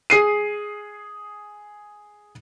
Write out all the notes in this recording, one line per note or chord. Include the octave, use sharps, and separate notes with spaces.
G#4 C7 D#7